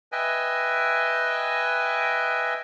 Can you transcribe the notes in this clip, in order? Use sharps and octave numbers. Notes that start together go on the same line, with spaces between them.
B4 D#5 E5 G5 G#5